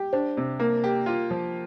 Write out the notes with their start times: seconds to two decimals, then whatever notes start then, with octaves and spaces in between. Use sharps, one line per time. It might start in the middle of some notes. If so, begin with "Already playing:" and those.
Already playing: G4
0.13 D4 C5
0.37 C3
0.60 A#3 A#4
0.84 G4
1.06 F4
1.31 F3